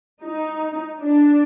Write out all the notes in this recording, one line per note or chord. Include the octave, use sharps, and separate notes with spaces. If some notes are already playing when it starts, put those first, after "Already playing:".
D#4
D4